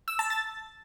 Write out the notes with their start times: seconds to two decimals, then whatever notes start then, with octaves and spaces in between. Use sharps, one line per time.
0.08 E6
0.19 A5
0.30 A6